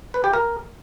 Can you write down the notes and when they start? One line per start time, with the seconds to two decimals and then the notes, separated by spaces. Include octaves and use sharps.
0.14 B4
0.24 G4
0.33 A#4